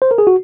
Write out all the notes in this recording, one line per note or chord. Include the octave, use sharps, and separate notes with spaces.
C5
A#4
G#4
F#4